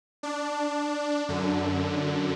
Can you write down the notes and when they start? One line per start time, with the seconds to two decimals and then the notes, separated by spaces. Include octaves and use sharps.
0.23 D4
1.29 F#2 D3